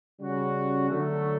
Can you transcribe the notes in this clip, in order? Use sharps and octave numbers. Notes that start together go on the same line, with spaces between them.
C#3 G3 C#4 F#4
D3 F#3 A3